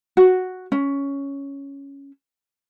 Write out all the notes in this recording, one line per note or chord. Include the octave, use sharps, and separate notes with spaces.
F#4
C#4